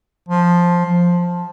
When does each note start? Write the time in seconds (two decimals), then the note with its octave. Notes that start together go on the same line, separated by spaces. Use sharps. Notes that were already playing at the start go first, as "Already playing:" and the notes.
0.29 F3
0.86 F3